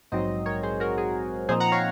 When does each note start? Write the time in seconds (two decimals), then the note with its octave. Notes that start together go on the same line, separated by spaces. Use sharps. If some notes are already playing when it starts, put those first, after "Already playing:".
0.12 A#1 G#2 F#3 C4 D#4 C5 D#5
0.46 A#4 C#5
0.63 G#4 C5
0.80 F#4 A#4
0.98 G#4
1.49 A#2 F3 C4 D#4 G#4 C5
1.60 F#5 A#5
1.72 C#5 F5